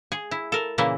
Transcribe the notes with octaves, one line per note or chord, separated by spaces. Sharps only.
G#4
E4
A4 A#4
A#2 C#3 E3 A#3 E4